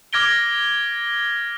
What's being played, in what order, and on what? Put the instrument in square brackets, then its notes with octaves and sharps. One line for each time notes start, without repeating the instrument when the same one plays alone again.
[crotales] D6 F6 G#6 A#6 D7 G7